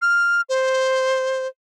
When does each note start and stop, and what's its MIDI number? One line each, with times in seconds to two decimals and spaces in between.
0.02 0.41 89
0.49 1.48 72